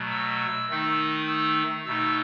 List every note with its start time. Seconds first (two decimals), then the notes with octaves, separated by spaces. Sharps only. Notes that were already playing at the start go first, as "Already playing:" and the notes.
Already playing: B2 F#3 A3
0.11 E6
0.69 D#3 A3 D#4 E6
0.99 D#6
1.28 E6
1.86 B2 A3 D#4 E6